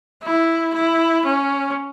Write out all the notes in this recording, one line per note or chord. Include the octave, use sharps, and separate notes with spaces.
E4
E4
C#4